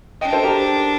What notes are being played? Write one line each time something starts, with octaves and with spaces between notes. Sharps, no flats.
D4 D#5 G5
A4 C5
G4 A#4